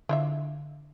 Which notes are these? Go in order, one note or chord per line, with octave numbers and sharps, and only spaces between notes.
D3 E4 F4 E5